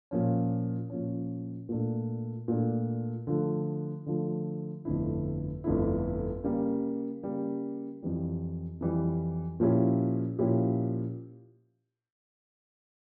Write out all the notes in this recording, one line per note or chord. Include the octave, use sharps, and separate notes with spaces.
A#2 F3 C#4
A#2 F3 C#4
A#2 A3 D4
A#2 A3 D4
D3 F3 A3
D3 F3 A3
G1 F2 D3 A3 E4
G1 F2 D3 A3 E4
C#3 G3 A#3
C#3 G3 A#3
F2 E3 G3
F2 E3 G3
A#2 F3 C#4 E4 G4
A#2 F3 C#4 E4 G4